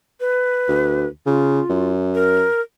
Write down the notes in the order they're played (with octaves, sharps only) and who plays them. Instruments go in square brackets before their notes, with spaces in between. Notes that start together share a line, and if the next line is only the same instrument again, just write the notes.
[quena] B4
[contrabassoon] D2
[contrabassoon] C#3 [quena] F4
[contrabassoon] F#2
[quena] A#4